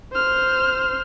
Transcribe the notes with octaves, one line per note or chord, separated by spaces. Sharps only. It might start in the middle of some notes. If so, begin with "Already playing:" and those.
C5 F6